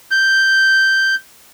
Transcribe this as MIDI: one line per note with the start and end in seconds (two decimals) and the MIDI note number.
0.11 1.15 91